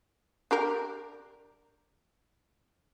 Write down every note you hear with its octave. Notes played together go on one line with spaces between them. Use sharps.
D4 G4 A#4